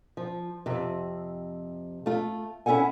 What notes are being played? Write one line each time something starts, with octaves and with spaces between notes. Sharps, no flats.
F3
F2 C3
A3 F4
C#4 E4 A4 F#5 G#5